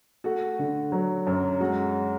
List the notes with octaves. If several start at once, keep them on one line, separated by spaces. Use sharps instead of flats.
A3 F#4
D3
F#3
F#2
G#3 F#4